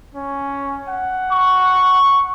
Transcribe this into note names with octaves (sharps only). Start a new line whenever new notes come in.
C#4
F#5
C#6